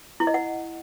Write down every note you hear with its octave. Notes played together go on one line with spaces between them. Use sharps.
E4
D#5
F#5